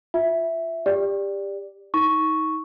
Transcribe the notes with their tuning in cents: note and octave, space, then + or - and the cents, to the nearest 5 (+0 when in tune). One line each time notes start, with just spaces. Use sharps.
F4 +15 E5 +0
G4 +20 D5 +0
D#4 +30 C#6 +0